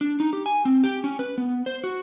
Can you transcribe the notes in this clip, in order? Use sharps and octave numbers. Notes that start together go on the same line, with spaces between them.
D4
D#4
G4
G#5
C4
G4
C#4
B4
B3
C5
F#4